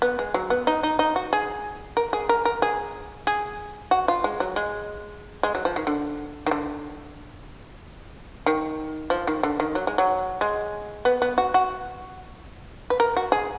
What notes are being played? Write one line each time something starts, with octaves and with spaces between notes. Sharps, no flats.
B3
G#3
F#3
B3
D#4
D#4
D#4
F#4
G#4
A#4
G#4
A#4
A#4
G#4
G#4
F#4
F4
G#3
F#3
G#3
G#3
F#3
F3
D#3
D3
D#3
D3
D#3
F3
D#3
D3
D#3
F#3
G#3
F#3
G#3
B3
B3
F#4
F#4
B4
A#4
F#4
G#4